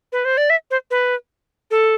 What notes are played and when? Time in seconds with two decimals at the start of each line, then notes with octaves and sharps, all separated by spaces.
0.13 B4
0.25 C5
0.37 D5
0.50 E5
0.71 C5
0.91 B4
1.71 A4